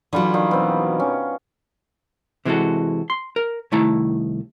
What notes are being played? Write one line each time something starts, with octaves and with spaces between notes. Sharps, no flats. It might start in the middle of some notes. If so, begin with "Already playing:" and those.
D3 E3 F#3 G3 F4
D#3 G3 F5
B2 C4
C#4
C3 E3 G#3 B3 F#4 A4
C6
A#4
C2 D#3 A3 E4 A5 A#5